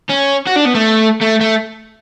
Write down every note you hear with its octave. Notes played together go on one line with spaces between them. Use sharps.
C#4
F#4
D4
B3
A3
A3
A3